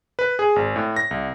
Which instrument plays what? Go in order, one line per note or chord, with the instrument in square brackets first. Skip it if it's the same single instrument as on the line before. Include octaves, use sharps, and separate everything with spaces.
[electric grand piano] B4
G#4
G#1
A2
A#6
C2